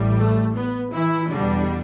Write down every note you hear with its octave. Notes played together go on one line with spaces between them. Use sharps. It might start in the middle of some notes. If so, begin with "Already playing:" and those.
Already playing: A1 A2 G3
A3
B3
E3 E4
E2 B2 D3 G3 D4